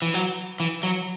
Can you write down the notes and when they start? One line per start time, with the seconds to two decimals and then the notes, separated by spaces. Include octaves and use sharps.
0.02 E3
0.14 F#3
0.60 E3
0.83 F#3